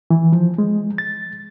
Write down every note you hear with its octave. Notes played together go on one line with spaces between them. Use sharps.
E3
F3
G#3
A6